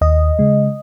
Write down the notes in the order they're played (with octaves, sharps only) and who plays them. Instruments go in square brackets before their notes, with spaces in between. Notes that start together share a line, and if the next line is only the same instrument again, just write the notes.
[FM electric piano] D#2 D#5
C#3 G#3